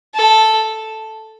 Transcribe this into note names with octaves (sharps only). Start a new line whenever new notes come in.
A4